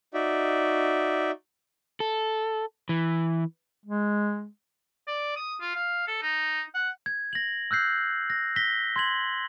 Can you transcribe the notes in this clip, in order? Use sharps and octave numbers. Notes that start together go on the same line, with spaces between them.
D#4 F#4 D5 E5
A4
E3
G#3
D5
D#6
F4
F5
A4
D#4
F#5
G#6
A#6 F#7
E6 F#6 G6 C7
A#6
A#6 B6 G7
C6 G#6 F#7